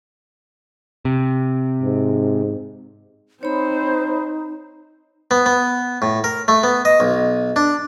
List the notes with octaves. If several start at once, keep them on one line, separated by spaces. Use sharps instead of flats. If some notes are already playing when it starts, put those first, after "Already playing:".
C3
G#2
C4 D#4 C5 C#5 B5
B3
B3
A2
A#4
A3
B3
D#5
B1
D4